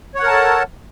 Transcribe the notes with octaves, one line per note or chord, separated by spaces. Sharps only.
A4 A#4 C#5 F#5 A5